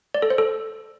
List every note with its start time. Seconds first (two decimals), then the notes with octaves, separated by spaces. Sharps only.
0.14 D5
0.22 A4
0.30 C5
0.38 A4